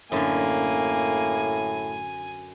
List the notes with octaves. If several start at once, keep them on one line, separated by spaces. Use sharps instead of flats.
F#2 A2 D3 A#3 G#5